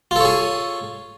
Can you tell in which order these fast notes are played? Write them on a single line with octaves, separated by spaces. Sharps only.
F4 A4 C#5 G#4